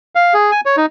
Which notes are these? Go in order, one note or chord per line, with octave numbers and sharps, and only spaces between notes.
F5
G#4
G#5
C#5
D#4